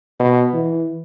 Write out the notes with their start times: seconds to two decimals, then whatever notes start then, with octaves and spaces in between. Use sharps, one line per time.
0.20 B2
0.54 E3